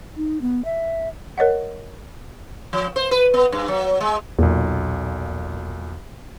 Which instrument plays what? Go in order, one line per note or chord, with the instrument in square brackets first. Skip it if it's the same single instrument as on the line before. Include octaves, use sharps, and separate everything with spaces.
[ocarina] D#4
B3
E5
[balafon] A#4 C#5 D#5 F#5
[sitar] F3
C5
B4
B3
G2
F#3
G#3
[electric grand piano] B1 A#2 [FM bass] E2